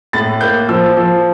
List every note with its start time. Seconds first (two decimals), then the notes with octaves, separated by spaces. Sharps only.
0.13 A2 A6
0.41 A#3 G6
0.68 F3 E6
0.97 F3